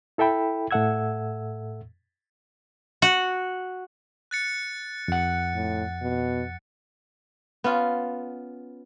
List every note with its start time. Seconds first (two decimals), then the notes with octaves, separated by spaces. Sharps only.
0.18 E4 A4 E5 G5 B5
0.71 A2 A4 E5 F#5 E6 G#6
3.02 F#4
4.31 F#6 A6 C#7
5.08 F2 F#5
5.55 A2
6.02 B2
7.64 B3 C#4 F4